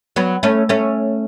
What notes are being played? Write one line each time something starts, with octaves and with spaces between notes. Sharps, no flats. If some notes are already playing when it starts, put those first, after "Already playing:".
F#3 B3
A3 C#4
A3 C#4